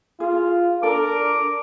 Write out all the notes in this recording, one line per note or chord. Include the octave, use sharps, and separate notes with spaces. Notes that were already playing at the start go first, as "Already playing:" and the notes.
F4 G#4
D4 A4 A#4 D6